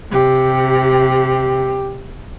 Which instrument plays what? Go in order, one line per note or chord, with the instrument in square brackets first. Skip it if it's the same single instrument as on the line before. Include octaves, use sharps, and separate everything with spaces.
[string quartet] C3 [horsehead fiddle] G4